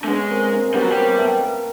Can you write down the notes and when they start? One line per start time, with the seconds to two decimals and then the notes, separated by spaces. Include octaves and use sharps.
0.01 D4
0.04 A3
0.08 G#3 B3 C#4
0.30 A#3 C4
0.52 A#3 C4
0.74 G3 B3 C#4
0.82 F#3
0.91 G3 A#3 C4
1.17 A3 B3
1.39 A#3